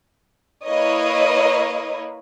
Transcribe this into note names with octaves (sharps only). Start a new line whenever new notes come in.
A#3 E4 B4 C#5 D#5